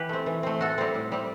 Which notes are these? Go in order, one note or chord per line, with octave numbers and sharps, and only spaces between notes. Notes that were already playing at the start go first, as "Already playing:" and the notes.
Already playing: E3 G4 B4
A3 C4
E3
A3 C4
A2 F#4 A4
G3 C4
A2
G3 C4